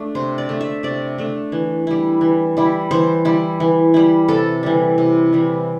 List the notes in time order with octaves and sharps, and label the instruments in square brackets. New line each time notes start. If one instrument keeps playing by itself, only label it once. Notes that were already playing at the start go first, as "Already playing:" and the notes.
Already playing: [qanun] A3 D4
C3 C5
D5
A3 D4
E5
C3 D5
A3 D4
E3
G3 E4
E3
G3 E4
E3 C5
G3 E4
E3
G3 E4
C3 A4
E3 G3
C3
E3 G3